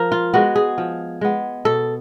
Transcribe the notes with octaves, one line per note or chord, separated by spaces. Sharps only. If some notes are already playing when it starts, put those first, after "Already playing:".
Already playing: F3 A#4
F4
G#3 B3 F#4
G#4
F3
G#3 B3
B2 A4